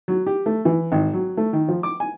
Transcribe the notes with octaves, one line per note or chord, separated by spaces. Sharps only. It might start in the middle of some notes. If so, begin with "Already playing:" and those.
F#3
G4
A3
E3
G#1
F#3
A3
D#3
F3
D6
G#5